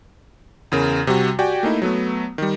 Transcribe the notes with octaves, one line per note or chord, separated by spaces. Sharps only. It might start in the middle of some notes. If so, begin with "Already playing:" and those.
E2 C#3 A#4
C3 G3 F#4
F#4 G4 D5 G5 G#5
A3 A#3 D#4 E4
F#3 A3 B3
D#3 G3